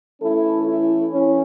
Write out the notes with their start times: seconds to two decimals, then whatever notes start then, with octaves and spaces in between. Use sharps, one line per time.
0.21 E3 A3 C#4 E4 A4
0.68 E4
1.13 C#4